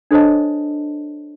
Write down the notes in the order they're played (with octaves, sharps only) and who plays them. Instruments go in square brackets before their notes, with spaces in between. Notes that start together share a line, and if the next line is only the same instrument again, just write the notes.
[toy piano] D4 A4 C5 C#5 D#5 A5